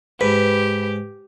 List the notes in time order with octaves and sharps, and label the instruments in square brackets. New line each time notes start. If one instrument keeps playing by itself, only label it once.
[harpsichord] G#2 [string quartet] G4 [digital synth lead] B4